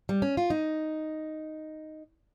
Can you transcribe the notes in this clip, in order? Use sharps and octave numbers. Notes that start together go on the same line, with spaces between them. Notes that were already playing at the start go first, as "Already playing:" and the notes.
G3
C#4
F4
D#4